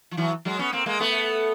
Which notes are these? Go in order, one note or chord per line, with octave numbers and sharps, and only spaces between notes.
F3
E3 F#3
F#3 G#3
B3 C#4
A#3 C4
G#3 A#3
A3 B3